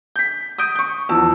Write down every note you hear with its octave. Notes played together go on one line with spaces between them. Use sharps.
G6 B6
D#6 G6 D7
C#6 G6
E2 F3 A5 E6